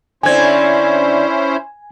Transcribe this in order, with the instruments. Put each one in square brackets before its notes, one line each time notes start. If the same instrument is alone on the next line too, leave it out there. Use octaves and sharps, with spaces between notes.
[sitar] D3 C4 [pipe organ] C#4 E4 C5 [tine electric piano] G#5 G#6